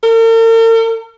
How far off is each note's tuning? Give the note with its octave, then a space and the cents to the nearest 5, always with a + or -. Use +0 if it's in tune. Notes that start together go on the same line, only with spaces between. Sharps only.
A#4 -45